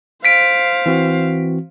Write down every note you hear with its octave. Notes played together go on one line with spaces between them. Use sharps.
C5 F5 B6 D7
E3 C4 F#4